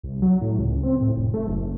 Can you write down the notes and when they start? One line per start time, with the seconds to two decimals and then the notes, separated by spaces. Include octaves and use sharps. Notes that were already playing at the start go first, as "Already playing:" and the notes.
0.03 C2
0.22 F#3
0.41 A2
0.59 C#2
0.83 C4
1.01 A2
1.16 F1
1.34 A3
1.47 F#1